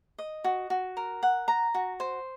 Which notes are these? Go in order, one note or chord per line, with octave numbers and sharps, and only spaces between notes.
D#5
F#4
F#4
A#4
F#5
A#5
F#4
C5